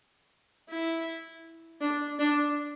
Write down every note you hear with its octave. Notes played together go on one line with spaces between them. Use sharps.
E4
D4
D4